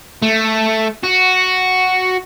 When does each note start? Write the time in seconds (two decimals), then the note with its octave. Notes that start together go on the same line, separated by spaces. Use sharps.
0.22 A3
1.03 F#4